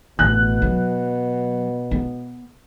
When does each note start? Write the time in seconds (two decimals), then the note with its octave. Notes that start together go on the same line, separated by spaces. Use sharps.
0.19 A1 B2 F#6
0.62 F#3
1.91 B3